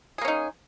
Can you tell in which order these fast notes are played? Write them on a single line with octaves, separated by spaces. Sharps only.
G#4 A#3 C#4 D#4